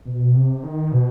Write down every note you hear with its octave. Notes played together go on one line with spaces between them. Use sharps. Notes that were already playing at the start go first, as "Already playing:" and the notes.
B2
C3
D#3
B2